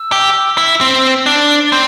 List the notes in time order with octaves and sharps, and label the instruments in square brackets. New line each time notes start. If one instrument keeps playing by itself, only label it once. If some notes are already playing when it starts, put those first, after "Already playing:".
Already playing: [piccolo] E6
[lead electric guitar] G4
E4
C4
D4
[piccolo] A6
[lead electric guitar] C4 [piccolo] G6